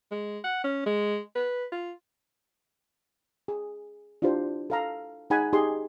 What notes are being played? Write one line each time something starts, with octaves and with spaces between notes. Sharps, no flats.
G#3
F#5
C#4
G#3
B4
F4
G#4
D4 E4 F4 G4 C5
A4 F5 A#5
D#4 G#4 F#5 G#5 B5
D#4 G4 G#4 D#5 C6